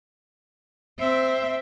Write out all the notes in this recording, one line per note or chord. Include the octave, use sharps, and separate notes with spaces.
C4 E5